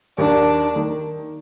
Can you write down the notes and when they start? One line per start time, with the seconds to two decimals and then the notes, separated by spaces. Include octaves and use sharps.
0.18 D#2 D#3 A#3 D4
0.76 D#3 A#3